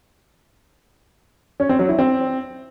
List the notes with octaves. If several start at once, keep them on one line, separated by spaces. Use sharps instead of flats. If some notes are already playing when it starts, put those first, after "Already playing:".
C#4
C4
F#3
E4
C4